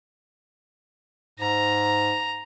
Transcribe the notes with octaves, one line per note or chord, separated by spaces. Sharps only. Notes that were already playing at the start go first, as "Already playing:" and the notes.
G#2 A#5